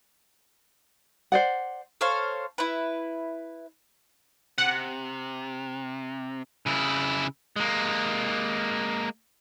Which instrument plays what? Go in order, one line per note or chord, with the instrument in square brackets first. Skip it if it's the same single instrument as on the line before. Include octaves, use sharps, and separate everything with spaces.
[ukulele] C5 D5 F#5
[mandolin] A4 C5 C#5 F5
E4 B4
[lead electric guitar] C3 [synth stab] F#5
[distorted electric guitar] C#3 E4
G#3 A#3